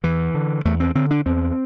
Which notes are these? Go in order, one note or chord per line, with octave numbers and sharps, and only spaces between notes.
E2 E3
D3
E2 A3
C4
D3 C4
D4
E2 C4